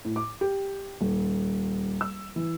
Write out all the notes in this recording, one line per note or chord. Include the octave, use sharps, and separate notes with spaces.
A2
D6
G4
D#1
E6
E3